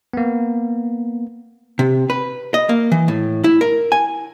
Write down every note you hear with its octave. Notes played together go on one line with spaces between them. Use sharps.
A#3 B3
C3
B4
D#5
A#3
E3
A2
E4
A#4
G#5